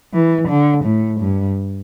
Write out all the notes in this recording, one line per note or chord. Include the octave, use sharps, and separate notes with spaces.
E3
D3
A2
G2